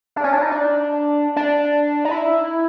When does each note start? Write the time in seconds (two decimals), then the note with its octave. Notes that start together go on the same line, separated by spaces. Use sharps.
0.16 D4
0.24 C#4
0.33 D4
0.42 D#4
0.51 D4
1.36 D4
2.05 D#4
2.11 E4